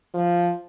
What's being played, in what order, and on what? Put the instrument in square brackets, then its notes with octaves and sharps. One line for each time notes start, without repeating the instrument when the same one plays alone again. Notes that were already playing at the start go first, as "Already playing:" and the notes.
[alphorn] F3